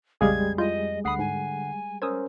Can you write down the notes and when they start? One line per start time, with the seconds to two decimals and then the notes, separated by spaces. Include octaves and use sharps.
0.21 A#1 F2 C#3 G3 G#3 G#4 F5 G#6
0.58 E4 F4 D#5 G6
1.04 D2 D3 F#5 B5 D#6 C7
1.19 G#2 G#5
2.02 C#4 A#4 C5 D#6 E6 G#6